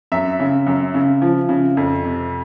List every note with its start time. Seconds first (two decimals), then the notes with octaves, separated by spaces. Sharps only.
0.12 F#2 E5
0.39 C#3
0.66 F#2
0.94 C#3
1.22 F3
1.49 C#3
1.77 F2
2.04 C3